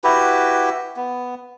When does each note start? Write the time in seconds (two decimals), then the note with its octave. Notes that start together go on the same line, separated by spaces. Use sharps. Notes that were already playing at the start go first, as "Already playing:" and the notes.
0.04 E4 F#4 G4 B4
0.96 B3